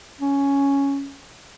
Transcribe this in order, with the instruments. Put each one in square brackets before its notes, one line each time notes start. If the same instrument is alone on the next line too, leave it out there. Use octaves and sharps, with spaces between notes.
[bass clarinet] C#4